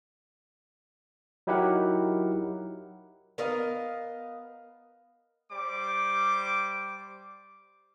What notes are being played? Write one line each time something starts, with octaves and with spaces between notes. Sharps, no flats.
F#3 D#4 E4 G4 A#4 F#5
B3 A#4 D#5 F5
G3 C5 D6